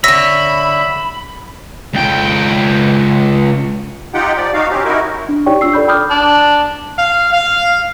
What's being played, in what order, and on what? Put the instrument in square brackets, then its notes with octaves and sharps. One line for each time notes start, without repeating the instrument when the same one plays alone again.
[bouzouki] D3 C#5 [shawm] E5 [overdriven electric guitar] B5 [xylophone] E6 A#6 B6
[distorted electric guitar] C#2 G5
[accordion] D#4 F4 G4 F#5 G5
F3 D5
D#4 F#4 F5
C4 C#4 G4
D#4 E4 F#4 A#4
[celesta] D4
D#4 G4 C#5 D5 G5 C#6
D4 F4 E6 C7
A4 D5 B5 G6
G5 B5 D6 D#6 F6 G6
[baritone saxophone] D4
[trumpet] F5
F5